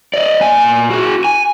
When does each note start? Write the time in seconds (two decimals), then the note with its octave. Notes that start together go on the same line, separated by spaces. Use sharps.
0.14 D5 D#5
0.41 A#2 G#5
0.91 F#4 G#4
1.25 G#5